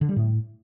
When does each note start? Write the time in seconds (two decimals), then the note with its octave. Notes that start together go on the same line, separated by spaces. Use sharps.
0.01 D3
0.09 G3
0.16 A2